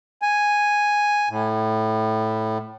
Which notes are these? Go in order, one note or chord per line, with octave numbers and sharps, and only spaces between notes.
G#5
A2